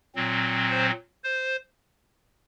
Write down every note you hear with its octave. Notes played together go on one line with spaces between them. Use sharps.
A#2 F#3 C4
C5
C5